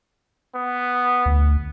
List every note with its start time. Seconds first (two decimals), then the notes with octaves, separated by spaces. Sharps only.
0.56 B3
1.26 D2